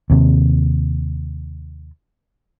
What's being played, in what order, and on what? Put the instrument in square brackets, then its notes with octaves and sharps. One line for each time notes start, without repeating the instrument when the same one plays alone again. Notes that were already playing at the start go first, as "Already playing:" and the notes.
[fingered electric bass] D#2 C3